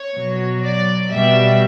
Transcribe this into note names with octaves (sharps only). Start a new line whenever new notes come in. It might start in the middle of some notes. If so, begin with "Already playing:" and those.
Already playing: C#5
B2 F#3
D5
B2 G3 E5